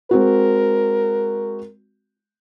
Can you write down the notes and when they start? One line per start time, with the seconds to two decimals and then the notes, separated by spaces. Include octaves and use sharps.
0.11 G#3 C4 F#4 A#4